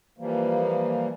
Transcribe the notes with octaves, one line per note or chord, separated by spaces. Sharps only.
E3 F3 G3 A#3